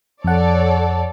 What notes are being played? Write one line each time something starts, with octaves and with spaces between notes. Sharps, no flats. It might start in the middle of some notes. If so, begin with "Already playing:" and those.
F2 A4 C#5 D5 F#5